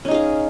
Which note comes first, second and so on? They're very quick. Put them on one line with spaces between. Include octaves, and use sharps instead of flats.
C#4 D#4 G#4 F5